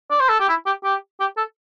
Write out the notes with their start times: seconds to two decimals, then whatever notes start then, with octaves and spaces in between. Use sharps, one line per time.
0.10 D5
0.20 C5
0.29 A4
0.40 G4
0.48 E4
0.66 G4
0.84 G4
1.20 G4
1.37 A4